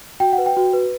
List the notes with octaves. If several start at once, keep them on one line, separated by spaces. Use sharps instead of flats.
F#4 G5
F#5
B4
G5
F#4
B4